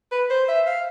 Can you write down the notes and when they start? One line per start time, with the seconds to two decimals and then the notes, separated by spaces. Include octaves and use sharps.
0.12 B4
0.30 C5
0.48 E5
0.67 F5